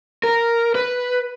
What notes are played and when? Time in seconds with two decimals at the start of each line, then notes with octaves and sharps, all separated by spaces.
0.24 A#4
0.75 B4